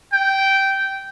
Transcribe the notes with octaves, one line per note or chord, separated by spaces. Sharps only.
G5